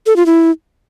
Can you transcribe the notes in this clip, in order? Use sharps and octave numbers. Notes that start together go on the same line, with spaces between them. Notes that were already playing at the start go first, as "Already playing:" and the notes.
A4
F4
E4